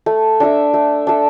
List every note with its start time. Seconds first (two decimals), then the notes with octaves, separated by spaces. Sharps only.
0.06 A3
0.40 D4 A4 E5
0.74 A3
1.07 D4 A4 E5